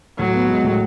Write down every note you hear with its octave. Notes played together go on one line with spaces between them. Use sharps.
A2 F#3
B3
G#3
A2